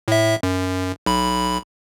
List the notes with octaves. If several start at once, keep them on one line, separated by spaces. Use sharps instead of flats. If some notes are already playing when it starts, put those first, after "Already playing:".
A2 E5
F#2
B1 B5